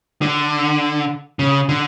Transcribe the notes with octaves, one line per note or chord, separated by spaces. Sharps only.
D3
C#3
D3